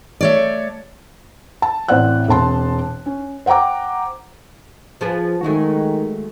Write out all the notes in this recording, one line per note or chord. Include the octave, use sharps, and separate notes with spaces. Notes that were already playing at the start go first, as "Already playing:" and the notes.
A3 C#5 D5
A5
A1 C4 C5 D5 F#5 F#6
E1 C4 A5 C6
C#4
C5 F#5 G5 A#5 D6
F3 G#4 B4
D#3 F#3 G#3 A3